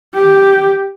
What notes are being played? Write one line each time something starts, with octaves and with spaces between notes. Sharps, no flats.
G4